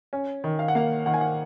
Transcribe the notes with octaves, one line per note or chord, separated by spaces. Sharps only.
C#4
D#3
F5
F#5
A#3 F5
D#3 F#5
G#5
F#5